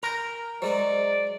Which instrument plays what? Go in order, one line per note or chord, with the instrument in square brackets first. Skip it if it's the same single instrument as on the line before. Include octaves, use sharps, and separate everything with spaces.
[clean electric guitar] A#4 [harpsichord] G5 G#5 A#5
[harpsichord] F#3 G#3 F#5 [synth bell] C5 D#5 [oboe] D5